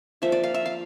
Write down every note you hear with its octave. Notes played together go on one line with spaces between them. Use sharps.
F3 A#3 E5
D5
F5
E5
F5